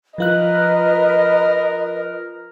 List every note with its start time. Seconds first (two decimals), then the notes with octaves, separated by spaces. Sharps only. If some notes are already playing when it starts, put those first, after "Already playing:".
0.18 F3 F4 A#4 B4 D#5 F#6